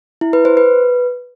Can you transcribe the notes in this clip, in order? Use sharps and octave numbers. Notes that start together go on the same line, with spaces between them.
E4
B4
C5
B4